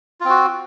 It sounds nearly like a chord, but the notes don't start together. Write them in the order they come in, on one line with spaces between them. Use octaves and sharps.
F4 C4 F#4